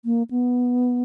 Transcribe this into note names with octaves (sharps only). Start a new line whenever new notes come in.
A#3
B3